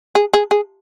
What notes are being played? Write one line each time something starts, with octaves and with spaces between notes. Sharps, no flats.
G#4
G#4
G#4